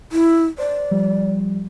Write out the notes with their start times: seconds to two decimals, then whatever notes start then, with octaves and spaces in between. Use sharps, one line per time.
0.12 E4
0.58 C5 D5
0.91 F3 G3